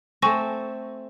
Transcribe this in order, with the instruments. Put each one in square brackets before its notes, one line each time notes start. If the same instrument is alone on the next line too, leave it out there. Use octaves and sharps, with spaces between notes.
[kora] A3 C4 [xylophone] G#5 C#6 A#6